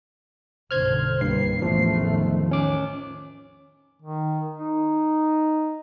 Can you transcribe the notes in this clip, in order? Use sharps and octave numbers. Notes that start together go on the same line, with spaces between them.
B1 G2 D3 C5 F6 G#6
C2 G2 A#3 C7
A1 E2 F3 A3
D#3
C#4 D6
D#3
D#4